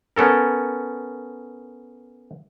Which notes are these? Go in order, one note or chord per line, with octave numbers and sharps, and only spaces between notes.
B3 C#4 A4 A#4